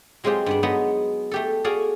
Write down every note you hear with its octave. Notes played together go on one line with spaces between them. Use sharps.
F#3 G#3 C4 F4 G4 G#4
G2 B3 D4
F#3 G#3 B3 D#4
A3 G4 A4
F#4 G#4 A4 D5 F5 G#5